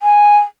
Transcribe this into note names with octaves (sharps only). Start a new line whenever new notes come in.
G#5